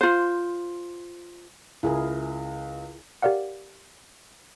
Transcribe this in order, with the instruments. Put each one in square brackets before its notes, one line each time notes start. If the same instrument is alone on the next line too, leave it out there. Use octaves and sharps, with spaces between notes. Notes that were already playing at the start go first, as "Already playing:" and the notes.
[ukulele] F4 C5
[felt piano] C#2 [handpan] E4 G#4 A#4
[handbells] G4 A#4 D5 F5 F#5